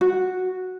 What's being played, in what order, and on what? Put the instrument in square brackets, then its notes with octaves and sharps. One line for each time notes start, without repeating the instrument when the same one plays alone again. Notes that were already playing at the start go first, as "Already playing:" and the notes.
[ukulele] F#4